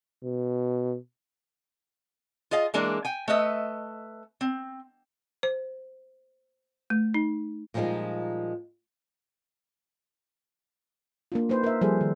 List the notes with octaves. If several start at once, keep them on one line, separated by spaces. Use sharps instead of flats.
B2
F4 G#4 D#5 F5
E3 G#3 A#3 D4
G5 G#5
A3 B4 D#5 E5
C4
C5
A3
D#4
A#2 F3 G3 G#3 D#4 A#4
A#3 D4 F4
A#3 D#4 B4 C5
A#4 E5
F3 G3 G#4 A4 C5
D#3